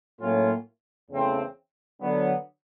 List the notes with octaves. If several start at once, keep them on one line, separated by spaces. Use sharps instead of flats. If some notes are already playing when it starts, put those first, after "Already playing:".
A2 F#3 A#3 C#4 F4
E2 C#3 E3 A3 C4
D3 F#3 B3